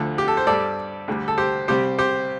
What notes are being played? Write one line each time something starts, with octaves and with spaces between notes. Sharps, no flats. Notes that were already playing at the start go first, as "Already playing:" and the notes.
Already playing: D2 D3 F3 A3
G4
A4
C5
G2 G3 A4 D5
D2 D3 G3
A4
G4 C5
C2 C3 G3 G4 C5
G4 C5